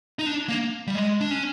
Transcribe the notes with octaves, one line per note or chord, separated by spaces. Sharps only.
D#4
D4
A#3
G3
G#3
D4
C#4